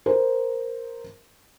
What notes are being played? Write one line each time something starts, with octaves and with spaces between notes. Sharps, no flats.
A#4 C5